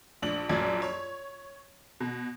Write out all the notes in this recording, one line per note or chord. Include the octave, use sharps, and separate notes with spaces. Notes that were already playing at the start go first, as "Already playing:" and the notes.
A#1 D4 F#7
A#1 F#2 D5 G#6
C#5
B2